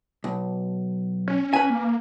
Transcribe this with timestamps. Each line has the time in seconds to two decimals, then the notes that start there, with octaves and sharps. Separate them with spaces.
0.24 B1
1.28 C#4
1.53 B4 G#5
1.70 A#3